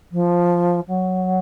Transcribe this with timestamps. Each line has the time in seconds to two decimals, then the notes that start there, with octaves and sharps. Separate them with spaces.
0.12 F3
0.88 F#3